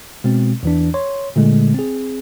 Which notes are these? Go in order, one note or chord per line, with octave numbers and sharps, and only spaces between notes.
B2 G#3 C4
E2 E3 D4
C#5 C6
A#2 D3 G#3 A3
C4 G#4